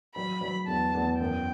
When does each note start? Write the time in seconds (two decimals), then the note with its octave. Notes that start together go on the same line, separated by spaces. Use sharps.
0.16 F#3 B5
0.41 F#3
0.68 E2 A5
0.95 E2
1.20 F#2 G5